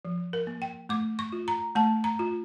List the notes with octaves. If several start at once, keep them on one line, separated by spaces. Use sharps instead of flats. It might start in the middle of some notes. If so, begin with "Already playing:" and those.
F3
A#4
A#3
G5
A3 D6
C#6
F4
A#5
A3 A5
A#5
F4